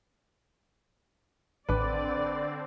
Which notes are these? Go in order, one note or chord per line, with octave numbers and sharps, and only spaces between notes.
A1 D3 C4 D4 B4 D5 D6